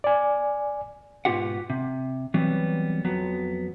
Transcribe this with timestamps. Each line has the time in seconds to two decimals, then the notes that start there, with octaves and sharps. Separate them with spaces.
0.04 D5 G#5
1.25 G#2 B2 B3 F4 G4 F#5
1.70 C3
2.34 E3 F#3 G3 B3 C4
3.05 F2 F#3 B3